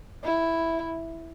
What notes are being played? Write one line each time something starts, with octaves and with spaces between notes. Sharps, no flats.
E4